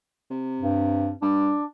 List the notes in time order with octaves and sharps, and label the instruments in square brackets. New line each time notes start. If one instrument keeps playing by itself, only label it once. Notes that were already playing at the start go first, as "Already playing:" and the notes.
[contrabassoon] C3
[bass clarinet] G2
[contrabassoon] G2 [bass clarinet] D4